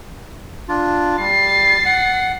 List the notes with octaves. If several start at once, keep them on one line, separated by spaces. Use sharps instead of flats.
D4 F4
G3 A6 C7
F#5